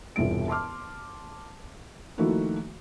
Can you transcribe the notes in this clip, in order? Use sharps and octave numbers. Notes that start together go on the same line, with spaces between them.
E1 C2 G2 F4 D7
A5 C6 D6 F6
D#3 F3 A3 A#3 E4 F#4